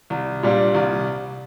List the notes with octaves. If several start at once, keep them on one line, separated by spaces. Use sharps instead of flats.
C2
A#2 G3 D4 F4
C2